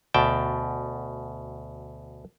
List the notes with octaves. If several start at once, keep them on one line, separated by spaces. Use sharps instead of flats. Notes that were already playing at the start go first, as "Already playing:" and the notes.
D2 B2 G5 A5